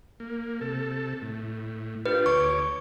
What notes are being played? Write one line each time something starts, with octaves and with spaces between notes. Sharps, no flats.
A#3
C3 A4
A2
D4 F4 G4 B4
D2 C#5 C#6 D6